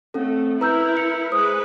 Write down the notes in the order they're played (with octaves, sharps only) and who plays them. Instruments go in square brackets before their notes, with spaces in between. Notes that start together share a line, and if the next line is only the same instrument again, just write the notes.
[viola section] A3 [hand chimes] C4 C#4 A4
[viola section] E4 A#4 [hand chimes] B4 [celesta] A#5 E6 G6
[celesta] C#7
[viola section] G#3 B4 [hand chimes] C5 [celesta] D#6